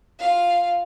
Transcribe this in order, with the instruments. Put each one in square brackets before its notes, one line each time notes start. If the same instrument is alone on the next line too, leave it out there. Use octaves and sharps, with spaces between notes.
[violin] F4 F5